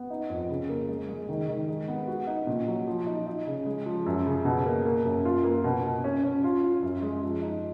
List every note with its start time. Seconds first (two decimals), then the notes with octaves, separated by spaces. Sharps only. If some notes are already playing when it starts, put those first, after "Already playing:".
Already playing: B3
0.10 D#4
0.30 F2
0.50 C#3
0.69 A#3
0.89 G#3
1.09 G#3
1.29 D#3
1.48 D#3
1.69 G#3
1.88 B3
2.07 F#4
2.27 D#4
2.47 A#2
2.68 F#3
2.87 F3
3.06 D#4
3.26 D#4
3.47 C#3
3.66 G#3
3.86 F3
4.06 F#2
4.26 C#3
4.45 B2
4.66 A#3
4.86 A#3
5.05 F#2
5.25 F4
5.44 A#3
5.64 B2
5.84 B2
6.04 C#4
6.23 C#4
6.44 F4
6.64 F4
6.83 F#2
7.02 G#3
7.22 F3
7.42 D#4